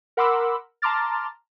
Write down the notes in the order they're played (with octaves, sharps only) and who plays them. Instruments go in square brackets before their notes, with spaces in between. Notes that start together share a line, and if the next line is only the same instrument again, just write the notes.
[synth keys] A#4 F#5 B5 C6 D6 E6
A5 A#5 C6 D6 F6 A6